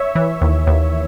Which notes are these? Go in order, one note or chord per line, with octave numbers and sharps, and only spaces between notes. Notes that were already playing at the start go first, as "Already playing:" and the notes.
Already playing: C#5 E5
E3
D#2
D#2